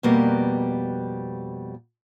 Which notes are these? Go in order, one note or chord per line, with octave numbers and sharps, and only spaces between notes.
F2 B2 G3 A#3 B3 A#4